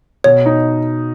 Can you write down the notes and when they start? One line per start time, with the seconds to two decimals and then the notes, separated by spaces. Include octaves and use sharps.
0.24 B2 C#5
0.46 D#4